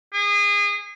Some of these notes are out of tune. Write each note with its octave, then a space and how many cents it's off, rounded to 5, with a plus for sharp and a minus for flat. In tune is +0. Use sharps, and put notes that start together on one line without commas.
G#4 -25